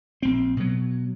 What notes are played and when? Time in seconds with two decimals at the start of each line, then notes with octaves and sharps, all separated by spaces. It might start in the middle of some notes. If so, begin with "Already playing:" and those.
0.22 A#1 C4
0.57 B2 F#3